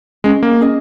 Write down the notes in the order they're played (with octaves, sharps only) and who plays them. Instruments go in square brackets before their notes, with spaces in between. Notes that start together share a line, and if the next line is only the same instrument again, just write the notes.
[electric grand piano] G#3 [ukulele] C#4 G#4 D#5
[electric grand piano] A#3
[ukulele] C#4 G#4 D#5